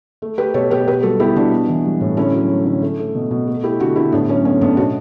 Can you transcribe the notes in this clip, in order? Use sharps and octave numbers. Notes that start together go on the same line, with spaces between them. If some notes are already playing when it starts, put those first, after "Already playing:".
A3
A3 G4 B4
B2 A4 C#5
B2 G4 B4
B2 G4 B4
G3 F#4 A4
B3 E4 G4
B2 D4 F#4
B3
E3
G3
A2
D3 C#4 E4
F#3
A3
D3
A3
A3
B2
B2
A3
A3 E4 G4
D3 F#4 A4
D3 E4 G4
A2 B3 D4
F#3 C#4
B3 C#4
A2 B3 D4
B2 D4 F#4